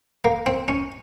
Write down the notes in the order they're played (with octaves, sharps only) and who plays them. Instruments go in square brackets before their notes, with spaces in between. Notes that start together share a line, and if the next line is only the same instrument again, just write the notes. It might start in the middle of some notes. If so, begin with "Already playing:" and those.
[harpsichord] A#3
C4
C#4